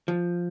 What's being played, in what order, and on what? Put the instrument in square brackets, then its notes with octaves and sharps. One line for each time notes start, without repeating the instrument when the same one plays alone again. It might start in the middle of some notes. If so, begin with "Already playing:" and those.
[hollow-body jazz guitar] F3